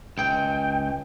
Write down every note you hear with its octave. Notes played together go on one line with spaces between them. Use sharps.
C#2 G5